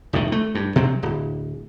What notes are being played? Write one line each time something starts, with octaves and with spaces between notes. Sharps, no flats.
F1 A2 D#3
A3
G2
C3 F#3 C4
D1